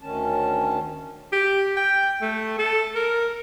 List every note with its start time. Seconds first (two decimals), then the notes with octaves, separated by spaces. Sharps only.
0.01 D2 D#3 C#4 A5
1.33 G4
1.77 G5
2.22 A3
2.59 A4
2.95 A#4